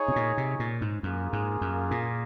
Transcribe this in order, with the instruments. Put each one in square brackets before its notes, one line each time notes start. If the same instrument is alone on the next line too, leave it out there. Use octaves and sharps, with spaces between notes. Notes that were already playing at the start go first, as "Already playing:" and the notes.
Already playing: [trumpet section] D#4 G#4 C#5
[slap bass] C3
A#2
C3
A#2
G#2
[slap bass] F#2 [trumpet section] A#3 F4 G#4
[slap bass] G#2
F#2
A#2